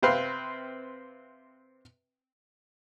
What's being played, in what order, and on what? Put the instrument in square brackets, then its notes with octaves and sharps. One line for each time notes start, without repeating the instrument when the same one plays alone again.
[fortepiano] C3 C4 B4 F5